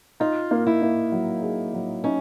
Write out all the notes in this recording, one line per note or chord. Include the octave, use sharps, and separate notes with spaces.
D#4 F4
A#3
E4
A#3
F#3
G#4
F#3
C#4 D#4